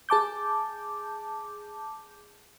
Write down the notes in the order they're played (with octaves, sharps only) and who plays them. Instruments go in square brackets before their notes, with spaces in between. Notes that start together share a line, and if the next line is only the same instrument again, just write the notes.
[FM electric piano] G#4 A5 D6 G6